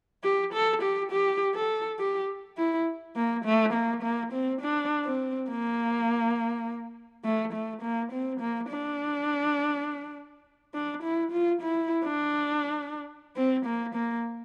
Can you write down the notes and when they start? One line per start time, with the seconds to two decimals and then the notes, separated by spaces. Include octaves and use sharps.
0.24 G4
0.53 A4
0.82 G4
1.12 G4
1.55 A4
1.99 G4
2.58 E4
3.16 A#3
3.45 A3
3.73 A#3
4.03 A#3
4.33 C4
4.61 D4
5.05 C4
5.50 A#3
7.25 A3
7.53 A3
7.82 A#3
8.12 C4
8.41 A#3
8.70 D4
10.74 D4
11.03 E4
11.32 F4
11.62 E4
12.05 D4
13.36 C4
13.66 A#3
13.95 A#3